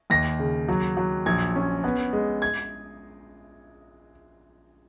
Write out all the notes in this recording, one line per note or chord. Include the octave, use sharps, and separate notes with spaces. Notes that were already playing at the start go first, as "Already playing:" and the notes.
D#2 A#6
C#3
F#3
F#3
A#1 G#6
C#4
B3
G#3
G#6